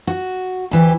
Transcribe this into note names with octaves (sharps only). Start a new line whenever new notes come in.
F#4
D2 E3 G4